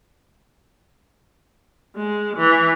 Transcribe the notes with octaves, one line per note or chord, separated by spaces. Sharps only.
G#3
E3